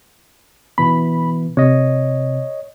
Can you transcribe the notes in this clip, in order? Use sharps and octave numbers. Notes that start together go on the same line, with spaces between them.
B2 E3 B3 B5
C3 C#5 D#5